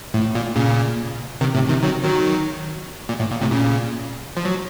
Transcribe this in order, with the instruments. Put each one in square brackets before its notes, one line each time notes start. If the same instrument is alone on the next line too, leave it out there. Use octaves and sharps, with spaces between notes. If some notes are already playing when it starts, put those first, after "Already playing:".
[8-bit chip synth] A2
A#2
A#2 C#3
C3 D#3
A2 C3
C3 D#3
D#3 F#3
D#3 F#3
A#2
A2
A#2
A2 C3
A#2 C#3
F3
F#3